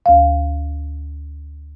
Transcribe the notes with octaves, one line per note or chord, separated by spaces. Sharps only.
D2 F5